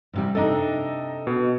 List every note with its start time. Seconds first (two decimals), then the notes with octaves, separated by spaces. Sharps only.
0.13 G#2 C3 G3
0.35 C3 D4 D#4 A4 D#5 A#5
1.27 B2